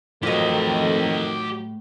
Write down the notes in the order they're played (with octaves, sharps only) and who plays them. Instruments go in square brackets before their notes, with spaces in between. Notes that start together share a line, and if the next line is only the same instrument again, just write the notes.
[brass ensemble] F2 D#3 A3 [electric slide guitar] A2 [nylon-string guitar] F#3 F4 [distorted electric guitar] G4 D#5